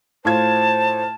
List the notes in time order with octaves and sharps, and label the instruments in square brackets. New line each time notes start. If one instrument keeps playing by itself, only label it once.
[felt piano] A2 F4 G#6 [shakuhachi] C5 [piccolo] A5